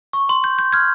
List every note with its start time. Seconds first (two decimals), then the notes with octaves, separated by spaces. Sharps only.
0.13 C#6
0.29 C6
0.44 G6
0.59 G6
0.73 F6 G#6